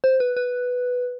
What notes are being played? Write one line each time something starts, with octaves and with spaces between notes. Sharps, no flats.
C5
B4
B4